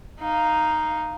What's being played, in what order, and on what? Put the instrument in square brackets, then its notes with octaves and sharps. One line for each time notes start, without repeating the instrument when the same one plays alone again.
[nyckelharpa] D#4 F5